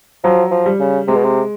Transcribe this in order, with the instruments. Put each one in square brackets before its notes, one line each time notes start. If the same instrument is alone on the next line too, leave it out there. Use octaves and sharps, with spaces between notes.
[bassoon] F3 [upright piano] F#3
[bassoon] F3
[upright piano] G3
[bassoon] C#3
[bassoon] C3 [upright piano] G#3
[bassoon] B2
C3